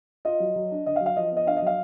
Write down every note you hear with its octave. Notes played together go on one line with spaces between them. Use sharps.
F4 D#5
F#3
F#3
D4
D3 D#5
F5
F#3
F5
F3 D#5
B3 D#5
D4 F5
D#5
F#3 F5